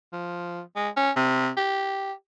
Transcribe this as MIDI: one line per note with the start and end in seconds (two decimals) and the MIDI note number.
0.13 0.60 53
0.76 0.89 56
0.97 1.11 61
1.16 1.50 48
1.57 2.13 67